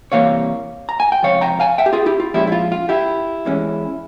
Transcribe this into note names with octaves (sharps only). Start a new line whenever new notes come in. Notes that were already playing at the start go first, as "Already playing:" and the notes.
C3 E3 G3 A#3 C#5 F5
A#5
G#5
G5
C#2 C3 F3 C#5 F5
G5 A#5
F5 G#5
E5 G5
G4
F4 G#4
E4 G4
F4
A#2 F3 G#3 C#4 E4 G4
E4
F4
F4
E4 G4
E2 E3 G#3 C#4